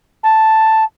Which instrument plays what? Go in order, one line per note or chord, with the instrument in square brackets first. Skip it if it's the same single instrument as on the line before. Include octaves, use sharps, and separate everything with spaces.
[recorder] A5